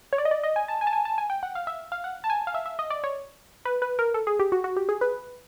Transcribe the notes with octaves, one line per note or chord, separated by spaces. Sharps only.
C#5
D5
D#5
D5
D#5
G#5
A5
G#5
A5
G#5
A5
G#5
G5
F#5
F5
E5
F5
F#5
A5
G#5
F5
E5
E5
D#5
D5
C#5
B4
B4
A#4
A4
G#4
G4
F#4
F#4
G4
G#4
B4